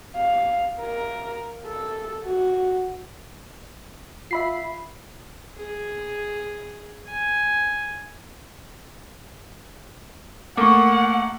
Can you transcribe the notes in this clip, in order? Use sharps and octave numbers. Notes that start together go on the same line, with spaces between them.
F5
A#4
A4
F#4
F4 E5 B5 C7
G#4
G#5
A3 A#3 F#5 C#6 D6